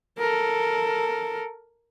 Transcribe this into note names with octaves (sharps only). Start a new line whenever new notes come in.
A4 A#4